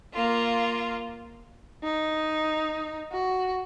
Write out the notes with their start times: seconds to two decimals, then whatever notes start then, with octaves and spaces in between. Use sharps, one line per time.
0.13 A#3 F4
1.83 D#4
3.13 F#4